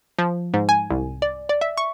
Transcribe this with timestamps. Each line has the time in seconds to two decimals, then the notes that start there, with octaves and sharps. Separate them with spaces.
0.19 F3
0.54 G#2
0.69 G#5
0.91 C2
1.22 D5
1.49 D5
1.61 E5
1.77 C#6